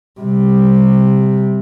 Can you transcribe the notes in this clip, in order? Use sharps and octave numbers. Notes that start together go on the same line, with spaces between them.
C3 G3